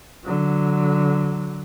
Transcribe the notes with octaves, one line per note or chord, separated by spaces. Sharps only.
D3 F#3